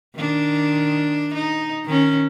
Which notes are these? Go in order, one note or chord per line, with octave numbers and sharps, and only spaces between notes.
D#3 D4
D#4
D#3 C#4